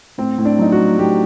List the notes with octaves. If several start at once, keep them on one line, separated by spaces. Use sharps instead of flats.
A2 C4
A2
D4
F#3 D#4
F#4
F#3
A2 G4